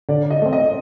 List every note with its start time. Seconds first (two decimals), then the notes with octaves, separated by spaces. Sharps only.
0.09 D3 D5
0.30 D#5
0.42 A3 C4
0.53 D#5